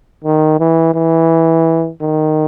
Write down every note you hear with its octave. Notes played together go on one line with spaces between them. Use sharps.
D#3
E3
E3
D#3